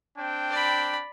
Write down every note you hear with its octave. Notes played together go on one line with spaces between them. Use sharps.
C4 D4 G5
D5 B5